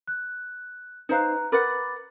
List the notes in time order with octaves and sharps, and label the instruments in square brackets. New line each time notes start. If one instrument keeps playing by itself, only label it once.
[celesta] F#6
[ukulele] D#4 C5 F5 [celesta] B4 A#5 F#6
[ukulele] A#4 B4 F#5 [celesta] B5 D6 A6